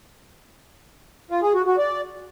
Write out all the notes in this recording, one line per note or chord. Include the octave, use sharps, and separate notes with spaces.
F4
G#4
F#4
F#4
D5